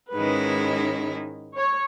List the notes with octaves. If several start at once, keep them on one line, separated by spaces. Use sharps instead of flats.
G#2 D#3 G#3 C#4 E4 B4
C#5